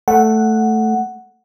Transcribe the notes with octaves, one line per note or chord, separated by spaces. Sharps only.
A3 F#5